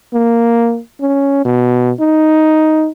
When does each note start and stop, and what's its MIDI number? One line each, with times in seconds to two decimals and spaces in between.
0.14 0.80 58
1.01 1.43 61
1.45 1.91 47
2.00 2.89 63